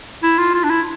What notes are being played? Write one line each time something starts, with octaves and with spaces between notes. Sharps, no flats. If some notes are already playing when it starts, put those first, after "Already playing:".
E4
F4
F4
D4
E4